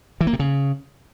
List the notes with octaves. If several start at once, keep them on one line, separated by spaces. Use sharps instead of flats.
E3
A#3
C3
C#3